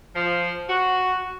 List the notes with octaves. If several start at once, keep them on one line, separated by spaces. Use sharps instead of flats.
F3
F#4